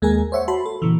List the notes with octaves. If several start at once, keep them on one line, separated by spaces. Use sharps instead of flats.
D#2 G#3 A#3 G#4 A#4 G#5
C5 C#5 E5 F#5 C#6
F#4 A5 B5 C6
A4
A#2 C#3 E3